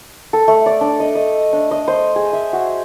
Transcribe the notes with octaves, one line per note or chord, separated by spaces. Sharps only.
A4
A3
D5
D4
D#5
D#5
D4
D#5
C5
G#4
E5
F#4